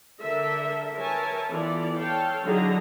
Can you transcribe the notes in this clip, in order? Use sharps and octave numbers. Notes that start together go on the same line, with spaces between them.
D3 A4 A#4 E5
A#4 B4 C#5 E5 G#5 A5
E3 B3 E4 F4 A4 D5
A4 C#5 F5 G5 A5
D3 F#3 D#4 E4 G#4 A#5